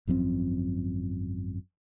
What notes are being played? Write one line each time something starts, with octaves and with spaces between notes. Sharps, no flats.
G#1 F#2 F3 C4